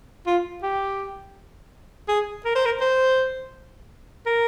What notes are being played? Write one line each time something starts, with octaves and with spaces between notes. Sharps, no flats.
F4
G4
G#4
A#4
C5
A#4
C5
A#4